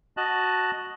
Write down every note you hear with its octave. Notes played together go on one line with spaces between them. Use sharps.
F#4 D#5 A5 F#6